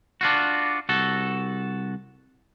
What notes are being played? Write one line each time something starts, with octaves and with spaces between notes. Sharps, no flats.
D4 F4 F#4
C2 F#4 A4